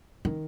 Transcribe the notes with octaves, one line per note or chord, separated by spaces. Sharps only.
D#3